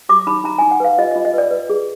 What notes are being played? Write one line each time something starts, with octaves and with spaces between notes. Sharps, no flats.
F#4 D6
D#4 B5
D#4 A#5
D#4 G#5
F#5
B4 F5
F4 D#5
F4 D#5
D#5
B4 D5
B4
G#4